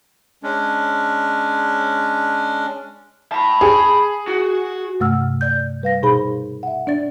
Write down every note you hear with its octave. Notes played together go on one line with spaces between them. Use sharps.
G#3 C#4 D4
A5 B5
G#4
F#4
G2 C3 A3 F#5 E6 F6
D5 G6
G3 B4 F5 A#6
B2 D#4 G#4 C5 B5
E5 F#5
D4 D5 A6